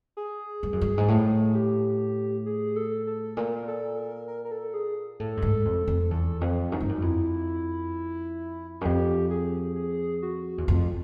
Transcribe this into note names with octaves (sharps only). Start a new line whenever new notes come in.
G#4
G2
F#2
G2
G#2
A2
G4
G#4
A4
A4
A#2 A#4
A4
A#4
A#4
A#4
A4
G#4
A2 A4
G2
G#2
F2
F2
E2 A4
F2
F#2 D#4
G2
F#2
F2 E4
F#2
F2 G4
G#4
G#4
F#4
E2
F2 F4